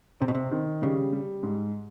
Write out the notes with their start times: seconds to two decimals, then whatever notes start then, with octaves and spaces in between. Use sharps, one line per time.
0.20 C3 C4
0.28 B2
0.35 C3
0.51 D#3
0.82 C#3 G3
1.13 G3
1.43 G#2